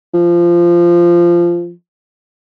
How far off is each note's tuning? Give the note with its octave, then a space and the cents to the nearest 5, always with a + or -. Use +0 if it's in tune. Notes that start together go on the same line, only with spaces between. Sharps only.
F3 -15